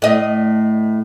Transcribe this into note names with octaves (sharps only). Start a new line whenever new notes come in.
A2 D#5